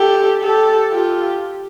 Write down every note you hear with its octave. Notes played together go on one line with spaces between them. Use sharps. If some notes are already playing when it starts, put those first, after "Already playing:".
Already playing: G4 A4
G4 A4
F4 G4